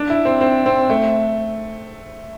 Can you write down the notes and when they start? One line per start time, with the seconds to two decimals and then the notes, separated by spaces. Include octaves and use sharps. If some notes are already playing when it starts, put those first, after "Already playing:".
Already playing: D4
0.10 E4
0.25 C4
0.41 C4
0.66 C4
0.90 A3